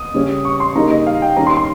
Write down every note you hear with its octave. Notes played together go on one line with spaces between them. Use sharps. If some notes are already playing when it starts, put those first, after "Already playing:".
Already playing: D#6
C#3 G3 C#4
C#6
C6
C#3 G3 A#3 D#4 A#5
D#5
F5
G5
D#3 G3 C#4 A#5
C6
C6